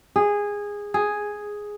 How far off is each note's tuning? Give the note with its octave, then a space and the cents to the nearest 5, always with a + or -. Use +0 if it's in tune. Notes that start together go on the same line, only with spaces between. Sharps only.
G#4 -15
G#4 +0